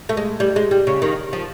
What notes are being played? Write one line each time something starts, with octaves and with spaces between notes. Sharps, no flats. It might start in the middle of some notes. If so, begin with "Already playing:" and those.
A3
G#3
G3
G#3
G3
C#3
D#3
F3